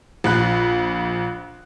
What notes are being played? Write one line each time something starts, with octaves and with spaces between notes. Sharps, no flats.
A#1 B5 F#6